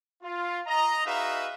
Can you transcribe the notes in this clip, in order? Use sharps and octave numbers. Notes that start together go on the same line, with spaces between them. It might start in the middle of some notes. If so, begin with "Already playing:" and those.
F4
D#5 A#5
D#4 F#4 G#4 B4 E5 F5